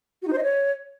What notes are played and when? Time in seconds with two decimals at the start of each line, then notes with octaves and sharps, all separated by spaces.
0.22 F#4
0.27 D#4
0.33 C5
0.38 D#5
0.43 C#5